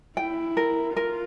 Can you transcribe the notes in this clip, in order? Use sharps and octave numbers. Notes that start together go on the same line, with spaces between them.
E4 G5
A#4
F4 A#4